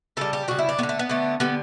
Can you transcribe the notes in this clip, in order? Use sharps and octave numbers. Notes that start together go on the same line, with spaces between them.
C#3 G3 A4
G4
C#3 G3 F#4
E4
D4
A3 B3
D3
A3
B3
D3 A3
D3 G3 B3